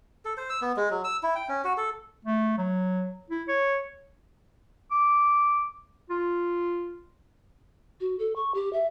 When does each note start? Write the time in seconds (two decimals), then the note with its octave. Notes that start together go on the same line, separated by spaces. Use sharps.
0.25 A4
0.37 C5
0.50 E6
0.62 B3
0.77 G#3
0.90 F#3
1.04 E6
1.23 E4
1.35 G5
1.49 C#4
1.64 F#4
1.77 A4
2.25 A3
2.58 F#3
3.30 E4
3.48 C#5
4.91 D6
6.10 F4
8.00 F#4
8.19 A4
8.36 C#6
8.54 G4
8.73 E5